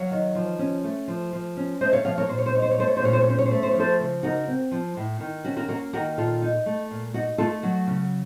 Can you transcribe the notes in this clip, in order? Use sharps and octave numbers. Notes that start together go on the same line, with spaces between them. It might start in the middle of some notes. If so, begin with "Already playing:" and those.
Already playing: F#3 C#5 F5
D#3
F3
C#4
A3
F3
F3
C#4
A3 C5 D#5
C#5 F5
F3 C#5 F5
A#4 C#5
A#2 C5
C#5
C5
D#4 C#5
C5
C#5
A3 C5
C#5
C5
A#2 C#5
C5
C#5
C#4 C5
C#5
C5
A3 C#5
C5
C#5
F3 A4 C5
C#3
D#4 F#4 A#4
C4
F3
A2
D#3
C#4 F#4
F#4 A#4
A#3 F#4 A#4
D#3 F#4 A#4
A#2 F4 A4
D#4
A3
A#2
D#4 F#4
A3 F4 A4
F#3 F#4
C#3